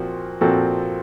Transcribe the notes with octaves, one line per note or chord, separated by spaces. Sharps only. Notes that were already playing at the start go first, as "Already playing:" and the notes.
Already playing: A#2 F3 C4 F#4
A#2 F3 C4 F#4 A4